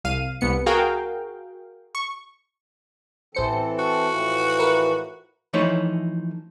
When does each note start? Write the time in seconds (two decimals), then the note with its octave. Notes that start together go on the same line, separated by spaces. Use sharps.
0.04 C2 F5 D#7
0.41 C2 B3 C#7
0.66 F#4 G#4 A#4 F5 G5
1.95 C#6
3.35 A1 E3 C4 A4 C5 C#7
3.79 F#4
4.09 A2 E3 F3
4.59 A#4 B4
5.53 E3 F3 A3 D#4 E4 C#5